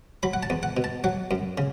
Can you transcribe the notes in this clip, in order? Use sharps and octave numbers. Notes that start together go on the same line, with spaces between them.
F#3 B5
F#5
A5
E2
F#5
B2
A5
F#3 F#5
F#2
C#3